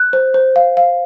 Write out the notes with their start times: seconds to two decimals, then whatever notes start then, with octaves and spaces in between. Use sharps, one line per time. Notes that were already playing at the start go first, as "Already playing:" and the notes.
Already playing: F#6
0.13 C5
0.34 C5
0.56 F5
0.77 F5